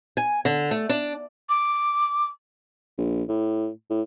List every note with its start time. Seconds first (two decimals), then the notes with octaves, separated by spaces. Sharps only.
0.17 G#5
0.45 D3
0.71 A3
0.89 D4
1.49 D6
2.98 A#1
3.28 A2
3.90 A2